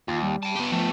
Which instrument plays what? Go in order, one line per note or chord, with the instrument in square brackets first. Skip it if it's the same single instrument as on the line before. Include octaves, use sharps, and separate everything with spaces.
[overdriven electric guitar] D#2 [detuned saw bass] F4
[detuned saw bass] G3
[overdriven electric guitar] G5 A5
[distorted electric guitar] B3 G4
[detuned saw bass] F3 [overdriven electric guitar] A3